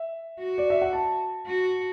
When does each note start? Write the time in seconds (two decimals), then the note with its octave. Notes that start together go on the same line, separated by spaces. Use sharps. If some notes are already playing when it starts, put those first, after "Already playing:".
Already playing: E5
0.40 F#4
0.58 D5
0.70 E5
0.82 F#5
0.93 A5
1.47 F#4